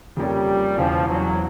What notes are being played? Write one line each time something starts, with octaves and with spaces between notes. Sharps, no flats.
F2 C#3 F3 G3 A#3 C#4
E1 E2 C#3 E3 F3
F#3